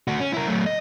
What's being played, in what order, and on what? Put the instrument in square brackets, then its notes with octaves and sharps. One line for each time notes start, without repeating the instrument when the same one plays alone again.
[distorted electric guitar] A3 F#4
C#4
E4 A#4
F#3 A3
D#5